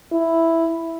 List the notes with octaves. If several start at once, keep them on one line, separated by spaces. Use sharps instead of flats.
E4